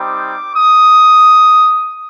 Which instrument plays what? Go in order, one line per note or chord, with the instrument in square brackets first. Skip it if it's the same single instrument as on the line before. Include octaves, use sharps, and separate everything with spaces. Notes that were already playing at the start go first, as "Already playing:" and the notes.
Already playing: [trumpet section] G3 C4 D#4 D6
D#6